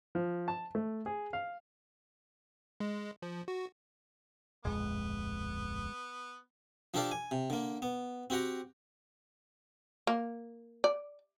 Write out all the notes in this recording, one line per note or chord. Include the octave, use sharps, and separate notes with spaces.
F3
A5
A3
G#4
F5
G#3
F3
F#4
D1 A#1 F2 G#3 B3
F3 D4 G4 A4 D5 F5
G#5
C3
D3 A#3
B3
C4 F#4 G4 F#5 A#5
A#3
D5